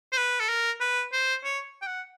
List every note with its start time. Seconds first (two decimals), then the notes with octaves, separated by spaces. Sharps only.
0.13 C5
0.17 B4
0.40 A4
0.49 A#4
0.80 B4
1.13 C5
1.44 C#5
1.82 G5
1.87 F#5